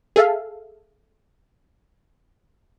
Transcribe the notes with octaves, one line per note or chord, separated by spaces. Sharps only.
G#4 A4 E5 F5